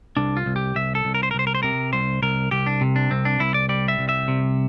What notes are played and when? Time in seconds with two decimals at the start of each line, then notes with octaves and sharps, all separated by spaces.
0.17 C2 D4
0.37 F4
0.46 C2
0.56 G4
0.75 C2 E5
0.95 A4
1.05 C2
1.15 A#4
1.23 C5
1.31 A#4
1.35 C2 C5
1.47 A#4
1.55 C5
1.63 C3 A#4
1.93 C2 C5
2.22 C2 A#4
2.51 C2 G4
2.66 D4
2.81 C3
2.96 D4
3.11 C2 C4
3.25 D4
3.40 C2 E4
3.54 D5
3.69 G3 D5
3.88 E5
3.99 C2
4.09 E5
4.28 C3